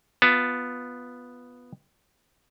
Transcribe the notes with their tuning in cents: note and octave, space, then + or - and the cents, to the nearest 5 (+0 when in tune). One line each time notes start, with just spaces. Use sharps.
B3 +0 F4 +5 A5 +0